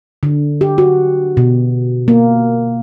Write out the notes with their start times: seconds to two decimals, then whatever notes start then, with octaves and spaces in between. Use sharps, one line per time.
0.23 D3
0.61 G4
0.78 F#4
1.37 B2
2.08 A#3